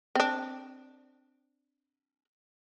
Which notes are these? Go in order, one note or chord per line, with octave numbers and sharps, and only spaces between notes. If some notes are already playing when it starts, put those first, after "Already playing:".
C4 D4